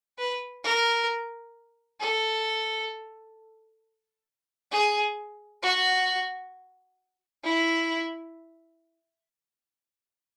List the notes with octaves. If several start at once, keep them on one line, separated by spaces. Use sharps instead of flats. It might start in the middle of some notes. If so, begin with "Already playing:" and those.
B4
A#4
A4
G#4
F#4
E4